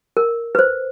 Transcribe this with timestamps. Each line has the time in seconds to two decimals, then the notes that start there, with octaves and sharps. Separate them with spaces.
0.17 A#4
0.55 B4 C5